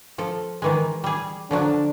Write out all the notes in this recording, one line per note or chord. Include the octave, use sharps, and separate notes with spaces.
F3 A4
D#3 E3 G#3
G3 G#4
D3 F3 F#3 D4